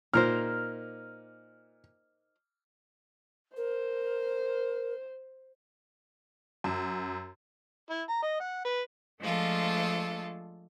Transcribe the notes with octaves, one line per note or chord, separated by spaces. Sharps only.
A#2 D#4 A#4 C5 F6
A#4 C5
F#2
E4
A#5
D#5
F#5
B4
F3 G#3 A3 D4 F4 A4